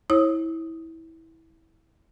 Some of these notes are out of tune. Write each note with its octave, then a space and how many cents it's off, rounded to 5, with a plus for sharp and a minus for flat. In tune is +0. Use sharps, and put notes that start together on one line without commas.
E4 -20 C#5 -40 D#6 +0